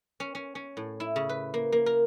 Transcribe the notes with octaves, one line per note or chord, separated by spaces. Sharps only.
C#4
C#4
C#4
A2
E4
C#3
B4
A#3
A#3
A#4